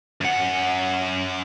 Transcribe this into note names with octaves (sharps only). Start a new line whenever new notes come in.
F#2 F#5